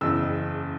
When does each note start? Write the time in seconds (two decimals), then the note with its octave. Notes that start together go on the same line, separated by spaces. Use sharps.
0.01 F#1 E2 C#3 E6